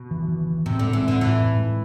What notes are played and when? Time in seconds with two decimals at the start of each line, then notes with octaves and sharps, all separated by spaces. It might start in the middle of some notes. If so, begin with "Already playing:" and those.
Already playing: B2
0.11 E3
0.28 E3
0.47 E3
0.66 A2 C3
0.79 D3 G#3
0.93 E3
1.03 A2
1.08 D3
1.21 A2 E3
1.40 A2
1.59 G#3